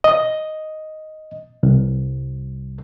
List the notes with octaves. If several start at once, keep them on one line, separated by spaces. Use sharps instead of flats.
D#5
C2